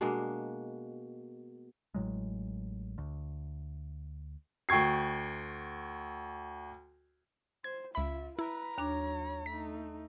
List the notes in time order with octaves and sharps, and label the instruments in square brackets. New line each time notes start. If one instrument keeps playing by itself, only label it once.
[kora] B2 G#3 A#3 D4
[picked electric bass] A1 A2 F#3 G#3
D2
[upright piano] D2 G5 C#6 G#6 C7
[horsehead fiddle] C5 [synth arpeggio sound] G#6
[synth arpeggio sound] C#2 B5 [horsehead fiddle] F4 [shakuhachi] E5
[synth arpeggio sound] E4 [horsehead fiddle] B4 [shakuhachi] A#5
[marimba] D#2 D4 D6 [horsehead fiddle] F#3 C#5
[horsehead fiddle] A3 D#4 [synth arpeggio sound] B6